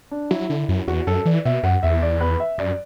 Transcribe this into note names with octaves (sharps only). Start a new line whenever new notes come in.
D4
F#3 E4
D3
F#2
E2 F#4
F#2 A4
E3 D5
B2 E5
F#2 F#5
E2 E5
D5
B4
E5
F#2 D5